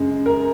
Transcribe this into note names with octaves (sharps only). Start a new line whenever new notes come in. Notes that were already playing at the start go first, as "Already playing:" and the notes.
Already playing: F#2 C#3 G#3
A#4